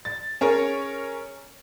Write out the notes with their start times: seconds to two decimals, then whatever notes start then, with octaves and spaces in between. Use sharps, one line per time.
0.05 A6
0.41 C#4 G#4 A#4 C#5